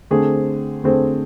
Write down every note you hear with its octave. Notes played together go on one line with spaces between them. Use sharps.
D3 A3 C4 G#4 C5
D3 A3 C4 G#4 C5